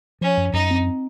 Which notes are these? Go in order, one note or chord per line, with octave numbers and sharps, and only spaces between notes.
F3 C#4
F#2
F#2 D#4
C4